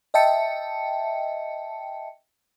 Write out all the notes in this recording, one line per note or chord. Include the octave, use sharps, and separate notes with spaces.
D#5 E5 G5 A5 C#7